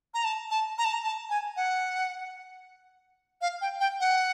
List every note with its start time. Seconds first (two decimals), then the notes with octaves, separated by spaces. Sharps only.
0.14 A#5
0.24 A5
0.51 A5
0.78 A#5
0.85 A5
0.93 A#5
1.04 A5
1.30 G#5
1.56 F#5
3.41 F5
3.61 G5
3.80 G5
4.00 F#5